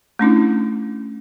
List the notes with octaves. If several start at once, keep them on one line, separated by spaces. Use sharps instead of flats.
A3 C#4 D4 E4